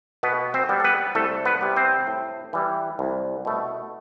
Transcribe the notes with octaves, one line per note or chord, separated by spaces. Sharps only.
B2 B3 B4
C4 C5
G3 B3
A4
B3 B4
C2 A3 A4
B3 B4
C3 G3 B3
C4 C5
A2
E3 G3
C2
B2 A3